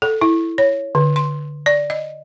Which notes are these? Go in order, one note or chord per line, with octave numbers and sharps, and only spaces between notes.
A4
E4
C#5
D3
C6
D5
D#5